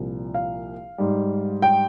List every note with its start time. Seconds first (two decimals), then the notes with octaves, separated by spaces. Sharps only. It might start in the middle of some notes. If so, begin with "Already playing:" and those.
Already playing: C2 A#2 F3
0.34 F5
0.98 G#2 G3
1.62 G5